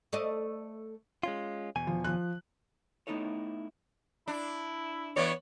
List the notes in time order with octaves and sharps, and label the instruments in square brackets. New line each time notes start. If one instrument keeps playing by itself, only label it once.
[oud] A3 D5 D#5
[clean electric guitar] G#3 C#4 F4
E2 B2 G#5
[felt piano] F3
F3 F#6
[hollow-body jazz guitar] A3 B3 D#4 E4 A4 C#5
[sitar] D4 [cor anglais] E4
[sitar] E3 D5 [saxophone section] B3 C#5